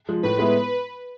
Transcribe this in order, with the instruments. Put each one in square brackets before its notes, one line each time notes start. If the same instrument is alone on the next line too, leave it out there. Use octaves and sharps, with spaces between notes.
[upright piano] F3 G#3
[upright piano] A2 [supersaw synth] B4
[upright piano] G#3 B3 E4